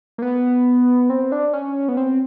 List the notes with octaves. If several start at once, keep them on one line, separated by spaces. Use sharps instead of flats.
A#3
B3
C4
D4
C#4
B3
C4